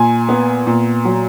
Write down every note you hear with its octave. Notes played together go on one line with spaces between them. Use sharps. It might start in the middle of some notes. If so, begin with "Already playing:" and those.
Already playing: A#2 G#5
B3
A#2
F#3